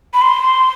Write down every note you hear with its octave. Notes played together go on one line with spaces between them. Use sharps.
B5
C6